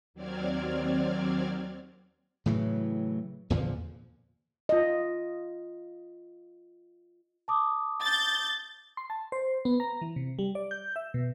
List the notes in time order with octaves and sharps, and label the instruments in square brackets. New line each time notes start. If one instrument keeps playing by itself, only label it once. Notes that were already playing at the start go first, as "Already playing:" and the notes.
[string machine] D#2 F#3 C4 D5 F6 G#6
[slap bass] A2 C#3 E3 F#3
E2 A#2 D3 F3
[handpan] F4 D#5
[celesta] A5 D6 D#6
[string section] G6 A6
[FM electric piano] C6
A5
C5
B3
A#5
E3
C3
G3
D5
G6
E5
B2